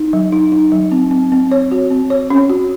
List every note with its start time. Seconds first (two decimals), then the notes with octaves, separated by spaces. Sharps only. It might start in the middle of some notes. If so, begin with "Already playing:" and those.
Already playing: D#4
0.13 F#3
0.32 D#4
0.52 D#4
0.72 F#3
0.92 C4
1.11 C4
1.32 C4
1.52 C#5
1.71 F#4
1.90 C4
2.10 C#5
2.30 C#4
2.50 F#4